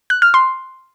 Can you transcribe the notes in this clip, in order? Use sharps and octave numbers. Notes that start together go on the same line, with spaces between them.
F#6
F6
C6